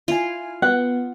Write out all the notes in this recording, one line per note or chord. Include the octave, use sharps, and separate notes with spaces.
E4 F4 G#5
B3 F#5